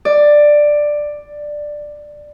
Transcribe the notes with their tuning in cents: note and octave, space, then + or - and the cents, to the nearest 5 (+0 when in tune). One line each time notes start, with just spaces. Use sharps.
D5 +10